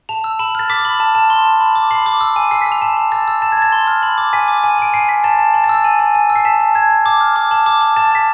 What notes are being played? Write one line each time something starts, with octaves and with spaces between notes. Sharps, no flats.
A5 F7
E6
B5 E7
F6 A6
D6 B6
B5
A5
A5
C6
A5
B5
D6
B5 C7
D6
E6
G#5
E6 C7
B6
E6
F7
A5 E7
A5
E6 A6
E6
A5 A6
G#6
A5 A6
C6
F6
B5
D6
G#5 B6
D6
G#5
G#5 D7
G#5 C7
G#5 B6
A5 A6
A5
A5
A6
E6
A6
G#5
G#5
G#5
E6
C7
A5 B6
A5
A5 G#6
A5
D6
F6
D6
A5
D6
A5
A5 A6
A5 B6